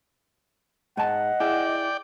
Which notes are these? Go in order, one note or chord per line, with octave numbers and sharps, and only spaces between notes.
G#2 D#5 F#5 G#5 A5
E4 G#4 D5 G5